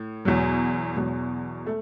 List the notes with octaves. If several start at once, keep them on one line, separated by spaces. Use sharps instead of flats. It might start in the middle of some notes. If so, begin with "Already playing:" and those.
Already playing: A2
E2 B2 F#3
E2 B2 F#3
A3